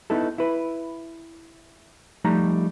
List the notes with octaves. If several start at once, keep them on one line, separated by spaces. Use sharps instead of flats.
B3 D#4 E4 A4
E4 B4
F3 G3 A3 D#4 A#5